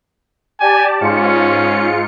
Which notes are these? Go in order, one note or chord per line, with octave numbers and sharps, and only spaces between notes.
G4 D5 G#5 A5
G#2 C#4 F4 C#7